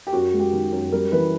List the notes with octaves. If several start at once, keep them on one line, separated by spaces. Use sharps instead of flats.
G4
F#2 F#4
G#3
G4
D#3
F#2
G3 A#4
E3 B4